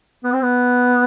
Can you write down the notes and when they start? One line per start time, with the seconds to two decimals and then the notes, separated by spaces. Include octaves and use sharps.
0.24 B3
0.33 C4
0.42 B3